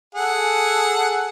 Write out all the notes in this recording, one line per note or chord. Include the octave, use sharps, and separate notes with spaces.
G#4 A4 F#5